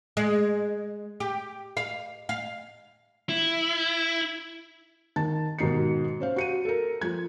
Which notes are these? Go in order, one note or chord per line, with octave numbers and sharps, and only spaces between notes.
G#3
G4
F5
F5
E4
D#3 A5 A6
G#2 B2 D#3 D#4 C7 C#7
C#4 C5 F5
F#4 C#7 D#7
A4 A#4
F3 G#6